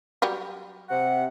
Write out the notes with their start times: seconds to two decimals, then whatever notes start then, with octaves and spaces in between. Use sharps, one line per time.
0.22 F#3 G3 G4
0.90 C3 F#5